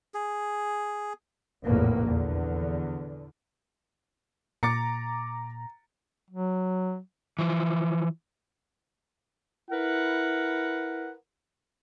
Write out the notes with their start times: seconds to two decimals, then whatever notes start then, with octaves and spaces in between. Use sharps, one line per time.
0.14 G#4
1.65 F1 A#1 E2 A2 A#3
2.06 E2 D3
4.63 A#2 A#5 D6 A6 C#7
6.30 F#3
7.39 E3 F3
9.70 E4 A#4 B4 F#5